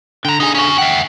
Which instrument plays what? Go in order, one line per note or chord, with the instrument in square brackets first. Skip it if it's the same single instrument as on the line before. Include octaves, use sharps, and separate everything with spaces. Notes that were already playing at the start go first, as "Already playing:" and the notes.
[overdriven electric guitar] D3 [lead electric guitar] G5 A#5
[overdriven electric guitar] D3 G#4 [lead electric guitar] D#4
[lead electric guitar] C#4 F#4
[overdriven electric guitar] C#2 G5 [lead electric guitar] E5 F#5